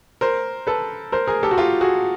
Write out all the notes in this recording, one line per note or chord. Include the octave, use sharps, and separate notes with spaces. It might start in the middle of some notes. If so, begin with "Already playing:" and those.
A#4 C5
A4 B4
A#4 C5
G#4 A#4
G4 A4
F#4
F4 G4
F#4 G#4